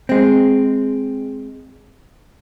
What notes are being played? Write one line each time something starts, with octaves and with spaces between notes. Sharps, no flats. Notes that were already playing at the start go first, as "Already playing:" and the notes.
G#3 C4